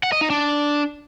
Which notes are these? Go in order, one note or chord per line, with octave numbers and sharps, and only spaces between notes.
F#5
D#5
D#4
D4